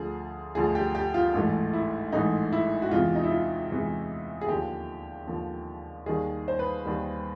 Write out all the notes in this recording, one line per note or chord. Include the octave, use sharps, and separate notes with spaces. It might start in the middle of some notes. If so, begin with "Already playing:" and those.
Already playing: D2 D3 F3 G#4
D2 D3 F3 G#4
G4
G4
F4
A1 G#2 E3 A3
E4
A1 G#2 E3 A3 D#4
E4
F#4
E2 C3 E3 G#3 F4
D#4
E4
F4
E2 C3 E3 G#3
G#4
D#2 D3 F3 G4
D#2 D3 F3
D#2 D#3 G3 G#4
C5
B4
D#2 D#3 G3